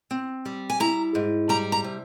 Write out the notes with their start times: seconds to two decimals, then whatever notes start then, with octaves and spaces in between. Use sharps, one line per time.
0.11 C4
0.46 G3
0.70 G#5
0.80 E4 A#5
1.15 G#2
1.49 G3 A#5
1.72 A#5
1.84 C3